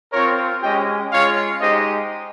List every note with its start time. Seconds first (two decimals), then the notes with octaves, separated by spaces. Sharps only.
0.13 C4 F4 A#4 C#5
0.63 G#3 C#4 G4 D#5 G5
1.12 G#3 C#4 F4 C#5 F5
1.61 G#3 D#4 G4 C5 D#5